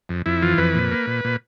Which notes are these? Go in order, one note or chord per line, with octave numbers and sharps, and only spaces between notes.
F2
F2 E4
E3 F4
F2 B4
A#2
A#3
A#2
A#2